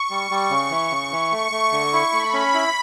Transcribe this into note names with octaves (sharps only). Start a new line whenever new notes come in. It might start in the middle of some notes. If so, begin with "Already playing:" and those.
Already playing: C#6
G3
G3
C#3
E3
C#3
E3
A3 C#6
A3
D3
E4
A3 B5
C#4
E4